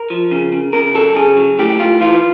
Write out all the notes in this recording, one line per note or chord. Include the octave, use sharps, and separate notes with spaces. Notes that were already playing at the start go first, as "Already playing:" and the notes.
Already playing: A#4
F3
C#3
C#3
C#3 A#4
F#3 A4
C#3 G#4
F#3
A2 G4
A2 F4
E3 F4